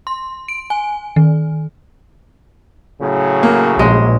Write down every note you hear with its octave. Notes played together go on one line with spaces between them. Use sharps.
C6
D7
G#5
D#3
A2 C#3 F#3
A#3
A#1 G#3 D#5